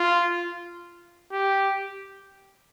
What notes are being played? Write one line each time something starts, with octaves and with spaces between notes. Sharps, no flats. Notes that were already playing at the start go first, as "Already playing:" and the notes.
Already playing: F4
G4